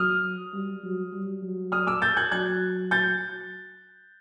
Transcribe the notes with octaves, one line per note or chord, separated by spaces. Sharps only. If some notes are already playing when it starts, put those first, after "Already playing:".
Already playing: F#3 D#6 F6
G3
F#3
G3
F#3
D#6 F6
D6 E6
G6 A6
F#6 G#6
F#3 F#6 G#6
G6 A6